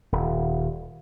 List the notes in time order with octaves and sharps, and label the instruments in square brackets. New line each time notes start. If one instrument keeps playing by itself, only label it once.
[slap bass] D#1